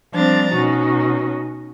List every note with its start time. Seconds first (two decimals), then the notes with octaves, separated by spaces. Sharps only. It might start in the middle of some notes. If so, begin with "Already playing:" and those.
0.14 F3 G3 C4 D4 A#5 A6
0.53 B2 C#4 D#4 F#4